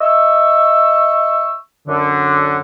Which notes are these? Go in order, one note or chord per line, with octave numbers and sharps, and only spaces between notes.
D#5 E5 C#6 E6
F#2 D3